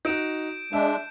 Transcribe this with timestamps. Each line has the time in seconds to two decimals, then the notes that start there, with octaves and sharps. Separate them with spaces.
0.05 D#4 F#4 G6 D7 E7
0.73 G#3 D4 E5